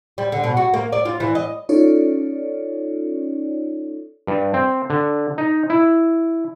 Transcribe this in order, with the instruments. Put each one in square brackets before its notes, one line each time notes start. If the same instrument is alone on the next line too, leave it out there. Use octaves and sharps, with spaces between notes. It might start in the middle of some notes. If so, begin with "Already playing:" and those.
[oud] G3
D3
B2
F#4
A#3
D5
F4
E3
D#5
[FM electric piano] C#4 D#4 F4 A4 C#5 D5
[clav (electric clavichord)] G2
C4
D3
D#4
E4